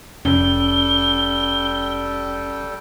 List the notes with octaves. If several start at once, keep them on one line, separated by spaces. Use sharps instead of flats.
F1 G3 C#4 A4 G5 G7